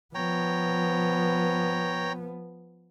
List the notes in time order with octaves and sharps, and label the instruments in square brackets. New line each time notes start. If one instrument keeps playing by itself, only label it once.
[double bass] F3 B3 [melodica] C#5 G5 A#5